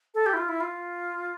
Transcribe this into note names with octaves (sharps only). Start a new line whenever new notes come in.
A4
G4
E4
F4
E4
F4